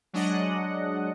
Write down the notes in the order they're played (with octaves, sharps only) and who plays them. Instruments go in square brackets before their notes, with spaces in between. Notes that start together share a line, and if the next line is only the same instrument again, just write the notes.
[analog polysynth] F#3 G#3 D4 D#5 F#5